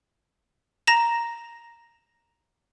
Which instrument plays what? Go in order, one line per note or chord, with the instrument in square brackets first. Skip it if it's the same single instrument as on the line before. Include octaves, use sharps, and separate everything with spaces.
[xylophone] A#5 A#6 E7